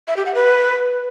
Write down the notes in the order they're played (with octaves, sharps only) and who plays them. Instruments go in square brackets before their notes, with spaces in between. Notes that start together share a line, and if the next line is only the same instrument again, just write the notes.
[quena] E5
G4
F#5
B4